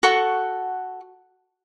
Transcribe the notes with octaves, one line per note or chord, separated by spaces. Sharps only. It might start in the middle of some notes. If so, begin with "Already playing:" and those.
F#4 A4 F#5 C#6